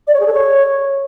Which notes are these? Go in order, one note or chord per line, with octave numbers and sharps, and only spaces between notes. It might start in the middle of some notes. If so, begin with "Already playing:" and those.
D5
C#5
G#4
A4
C#5